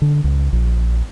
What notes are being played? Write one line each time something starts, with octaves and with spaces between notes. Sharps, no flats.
D3
C#2
A#1